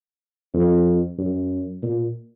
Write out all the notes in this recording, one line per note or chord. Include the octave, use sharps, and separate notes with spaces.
F2
F#2
A#2